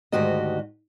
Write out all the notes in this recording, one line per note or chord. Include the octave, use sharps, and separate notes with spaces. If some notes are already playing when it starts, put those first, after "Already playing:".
D2 G#2 D#3 F#4 G4 D#5